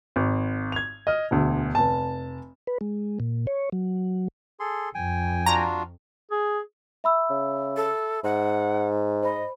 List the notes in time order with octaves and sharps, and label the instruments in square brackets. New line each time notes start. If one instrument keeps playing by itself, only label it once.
[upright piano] G#1
G#6 F7
D#5 F6
E1 D2
F1 A5
[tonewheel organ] B4
G#3
A#2
C#5
F#3
[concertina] G#4 A4 C6
[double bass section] F2 [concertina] G5 G#5
[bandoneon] D4 F4 F#4 [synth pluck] A#5
[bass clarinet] G#4
[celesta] E5 B5 E6
[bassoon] C#3
[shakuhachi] A4
[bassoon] G#2 [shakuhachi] F#5
[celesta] C5 B5 [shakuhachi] D#5